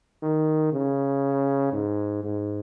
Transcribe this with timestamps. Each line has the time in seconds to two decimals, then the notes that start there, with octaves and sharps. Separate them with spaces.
0.22 D#3
0.72 C#3
1.73 G#2
2.23 G#2